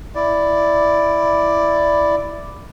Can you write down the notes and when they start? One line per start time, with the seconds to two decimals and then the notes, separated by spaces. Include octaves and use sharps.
0.15 E4 D5